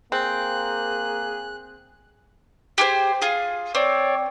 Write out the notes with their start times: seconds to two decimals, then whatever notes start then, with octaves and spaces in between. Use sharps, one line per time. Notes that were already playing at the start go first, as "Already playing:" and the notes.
0.12 A#3 C4 G#4 F#6
2.78 G4 G#4 C5
3.22 F4 G#4
3.75 C4 C#5 D5